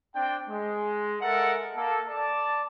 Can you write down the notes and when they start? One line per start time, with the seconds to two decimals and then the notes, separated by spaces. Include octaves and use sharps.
0.15 C4 D4 G5
0.50 G#3
1.21 G#3 A4 A#4 E5 F#5
1.75 A#3 A4
2.08 D5 A5